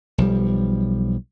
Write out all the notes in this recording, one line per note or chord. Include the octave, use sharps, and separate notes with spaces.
B1 F3 G3